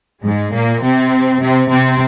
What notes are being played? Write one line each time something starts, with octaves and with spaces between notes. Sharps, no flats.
G#2 G#3
A#2 A#3
C3 C4
C3 C4
C3 C4